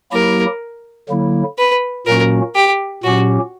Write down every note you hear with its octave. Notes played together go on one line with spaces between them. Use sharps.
F#3 A#3 E4 G4 A#4
D3 F#3 A#3 E4
B4
A#2 F#3 A#3 C#4 F#4 A#4
G4
A#2 F#3 C#4 F#4 G4